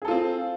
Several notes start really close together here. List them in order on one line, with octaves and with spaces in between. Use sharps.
G#4 A4 F4 C4